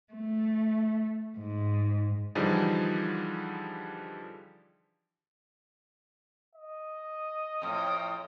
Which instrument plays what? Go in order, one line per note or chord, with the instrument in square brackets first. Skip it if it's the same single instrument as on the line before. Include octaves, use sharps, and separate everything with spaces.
[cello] A3
G#2
[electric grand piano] D3 E3 F3 G3 D#4 G#4
[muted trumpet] D#5
[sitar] F2 A2 [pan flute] D#6